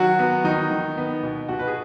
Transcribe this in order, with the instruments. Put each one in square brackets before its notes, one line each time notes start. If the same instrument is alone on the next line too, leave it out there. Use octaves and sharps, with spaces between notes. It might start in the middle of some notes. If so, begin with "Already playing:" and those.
Already playing: [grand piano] D#3 F#3 F#4
B3
D#3 D#4
D#3
B3
B2
B2 F#4
B4
G#4